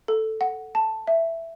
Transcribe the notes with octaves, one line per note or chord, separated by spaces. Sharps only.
A4
F#5
A5
E5